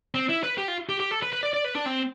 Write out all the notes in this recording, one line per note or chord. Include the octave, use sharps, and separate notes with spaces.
C4
E4
B4
G4
F4
G4
G4
A4
B4
B4
D5
D5
B4
D4
C4